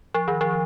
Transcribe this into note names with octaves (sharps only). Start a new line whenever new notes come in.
F3
D#3
F3